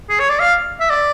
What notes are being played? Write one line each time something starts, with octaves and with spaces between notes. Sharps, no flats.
G#4
C#5
D5
F5
E5
D5